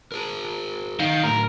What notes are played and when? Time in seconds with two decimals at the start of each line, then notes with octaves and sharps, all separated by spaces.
0.12 G#4 A#4
1.00 D#3 F5
1.24 A2 D3 A#4